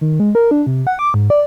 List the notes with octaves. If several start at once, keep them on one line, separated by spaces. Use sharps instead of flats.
D#3
G#3
A#4
D4
C3
F#5
D6
G#2
D5